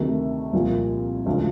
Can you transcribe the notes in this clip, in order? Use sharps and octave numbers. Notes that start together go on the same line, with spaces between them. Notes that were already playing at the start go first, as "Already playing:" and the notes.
Already playing: D2 C3 D#3 F#3 A3
C2 A#2 F3
D2 C#3 F3 G#3